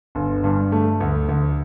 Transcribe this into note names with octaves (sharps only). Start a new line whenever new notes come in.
G1
G2
A3
D2
D2